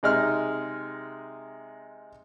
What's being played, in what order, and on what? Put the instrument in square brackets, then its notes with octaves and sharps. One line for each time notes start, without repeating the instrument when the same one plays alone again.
[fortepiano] C3 G#3 D#4 F6